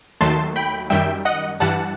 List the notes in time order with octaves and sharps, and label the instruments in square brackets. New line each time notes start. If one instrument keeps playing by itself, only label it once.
[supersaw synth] D#2 D#3 F#3 A3 A5 C6
G5 B5
F#2 D#3 G3 E5 G5
D#5 F#5
G2 E3 G3 F#5 A5